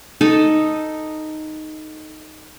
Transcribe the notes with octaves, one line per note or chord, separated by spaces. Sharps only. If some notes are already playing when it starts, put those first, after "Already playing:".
D#4 A4 D#5